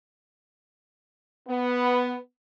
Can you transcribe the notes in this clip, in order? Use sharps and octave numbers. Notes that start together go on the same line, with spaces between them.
B3